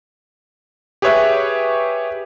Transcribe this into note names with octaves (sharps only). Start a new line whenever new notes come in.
G4 G#4 B4 C#5 E5 F#6